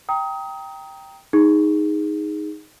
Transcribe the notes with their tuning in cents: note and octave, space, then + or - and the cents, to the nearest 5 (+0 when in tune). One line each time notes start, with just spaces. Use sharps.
G5 +0 A#5 +0 D#6 +25
D#4 +0 G#4 -10